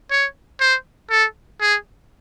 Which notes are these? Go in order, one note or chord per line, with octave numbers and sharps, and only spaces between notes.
C#5
C5
A4
G#4